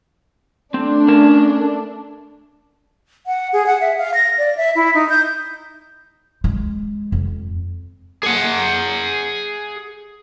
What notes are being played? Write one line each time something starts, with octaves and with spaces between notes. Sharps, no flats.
A3 C4 D4
C#4 A#4 A5
F#5
G#4
F#5
E5
F5
A#6
D5
E5
E4
D#4
G6
G#3
F2
G#4 F#5